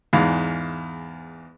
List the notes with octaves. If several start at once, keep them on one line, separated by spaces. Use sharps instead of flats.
E2 G#2 F5